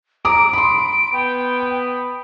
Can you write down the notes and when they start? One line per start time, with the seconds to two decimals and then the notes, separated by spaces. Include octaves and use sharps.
0.25 A#5 D6 D#6 D7
0.53 B5 C6
1.13 B3 G5